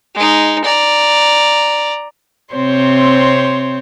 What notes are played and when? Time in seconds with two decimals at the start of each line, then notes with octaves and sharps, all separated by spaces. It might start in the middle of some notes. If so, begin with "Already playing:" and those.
0.15 G#3 D#4
0.64 D5 A#5
2.54 C3 C4 C5 C#5 C6